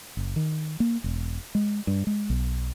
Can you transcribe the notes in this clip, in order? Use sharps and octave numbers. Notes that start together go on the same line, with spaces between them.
F#1
D#3
A#3
E1
G#3
G2
G#3
B1